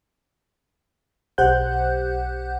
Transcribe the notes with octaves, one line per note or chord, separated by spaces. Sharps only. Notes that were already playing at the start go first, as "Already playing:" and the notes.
B1 G4 C5 F#5 F#6 G6